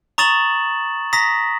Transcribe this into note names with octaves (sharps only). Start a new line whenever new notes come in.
A#5 C#6 D#6 A6 E7 F#7
A#5 D#6 A#6 B6